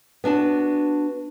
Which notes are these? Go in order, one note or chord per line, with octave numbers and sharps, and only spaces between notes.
B3 D4 F#4 A5